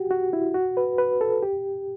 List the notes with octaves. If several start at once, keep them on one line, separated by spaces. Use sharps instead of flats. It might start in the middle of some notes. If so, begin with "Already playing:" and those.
Already playing: F#4 G4
F#4
E4
F#4
B4
B4
A4
G4